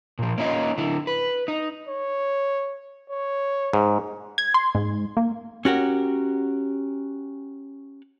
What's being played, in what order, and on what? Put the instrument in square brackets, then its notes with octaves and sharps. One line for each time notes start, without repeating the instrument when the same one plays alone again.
[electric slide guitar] A#2 F3
A#3 C#4 D#4 F4 D#5
D3 E4
B4
D#4
[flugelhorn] C#5
C#5
[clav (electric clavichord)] G#2
[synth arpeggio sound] G#6
C6
G#2
A#3
[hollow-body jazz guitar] C#4 F#4 G4 A#4